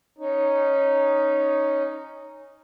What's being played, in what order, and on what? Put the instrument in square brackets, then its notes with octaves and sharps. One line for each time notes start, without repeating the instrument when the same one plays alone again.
[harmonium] C#4 D#4